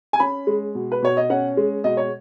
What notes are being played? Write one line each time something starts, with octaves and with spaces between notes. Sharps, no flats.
G#5
C#4 B5
G#3
B2
B4
B2 C#5
D#5
C#4 F#5
G#3
B2 D#5
C#5